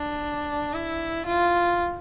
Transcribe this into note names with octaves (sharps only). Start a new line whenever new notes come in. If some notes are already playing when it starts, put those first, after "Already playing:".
Already playing: D4
E4
F4